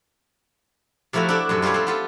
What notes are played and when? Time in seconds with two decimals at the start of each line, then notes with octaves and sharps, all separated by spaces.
1.13 C3 F3 A3 E4 F#4 A#4
1.29 D4 E4 A4 D5
1.49 F#2 C3 A4
1.62 G3 F4 G4 B4 C#5
1.74 C4 A4
1.87 B3 F4 A4